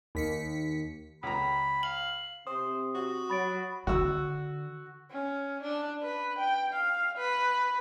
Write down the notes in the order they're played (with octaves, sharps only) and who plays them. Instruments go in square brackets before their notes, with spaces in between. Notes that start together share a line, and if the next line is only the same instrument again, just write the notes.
[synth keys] D#2 B6 C#7
[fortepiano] C#2 A#5 [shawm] B5
[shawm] F5 [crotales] F#7
[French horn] C3 [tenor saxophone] C5 [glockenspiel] D#6
[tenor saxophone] F#4
[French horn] F#3 [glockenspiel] B5 A6 D7
[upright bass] D3 [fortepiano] F#4 E6
[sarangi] C#4
D4
B4
G5
F5
B4